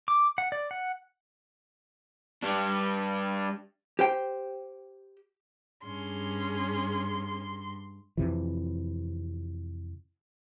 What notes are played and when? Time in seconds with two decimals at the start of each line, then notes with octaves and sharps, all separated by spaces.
0.08 D6
0.38 F#5
0.52 D5
0.71 F#5
2.43 G3 D4
3.99 G4 C5 G5
5.86 G2 C#4 G#4 C6
8.17 F2 C3 E3